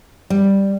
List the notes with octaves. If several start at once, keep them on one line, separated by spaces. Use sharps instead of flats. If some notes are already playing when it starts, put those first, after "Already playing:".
G3